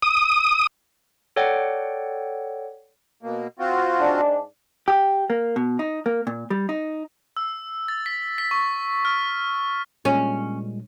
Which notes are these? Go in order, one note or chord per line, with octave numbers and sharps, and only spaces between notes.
D#6
A4 C#5 D5 F#5 G5
B2 A#3
C4 F4 F#4
G#2 D4
G4
A#3
B2
D#4
A#3
A#2
G3
D#4
E6
A6
B6
B6
C#6
F6
A#2 G3 G#3 C#4